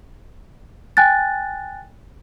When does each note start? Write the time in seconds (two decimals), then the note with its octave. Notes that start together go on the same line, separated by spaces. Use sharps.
0.97 G5 G#5 F#6 A6